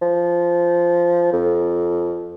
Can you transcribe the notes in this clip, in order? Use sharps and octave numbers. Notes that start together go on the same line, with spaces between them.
F3
F2